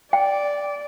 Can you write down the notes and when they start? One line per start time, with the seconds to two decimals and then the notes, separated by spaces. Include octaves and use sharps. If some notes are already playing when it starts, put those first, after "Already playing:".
0.13 D5 G5